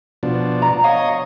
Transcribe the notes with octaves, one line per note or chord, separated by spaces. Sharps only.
B2 F3 D4
A#5
C#5 D#5 F5